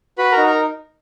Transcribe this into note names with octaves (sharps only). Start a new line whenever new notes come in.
F#4 B4 B5
A#4 A#5
D#4
A#4 A#5